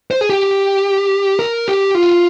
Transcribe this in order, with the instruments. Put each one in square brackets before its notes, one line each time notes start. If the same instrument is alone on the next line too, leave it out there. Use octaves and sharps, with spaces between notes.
[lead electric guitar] C5
G#4
G4
A#4
G4
F4